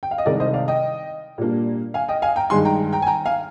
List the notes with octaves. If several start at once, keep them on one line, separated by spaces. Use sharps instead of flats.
G5
F5
D#5
C2 C3 D#3 G#3 A#4 D5
C5 D#5
D5 F5
D#5 G5
A#2 G3 A#3 D4
F5 G#5
D#5 G5
F5 G#5
G5 A#5
G2 D#3 G#3 G#5 C6
G5 A#5
G5 A#5
G#5
G5 A#5
F5 G#5